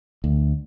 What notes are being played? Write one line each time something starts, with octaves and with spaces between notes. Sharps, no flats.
D2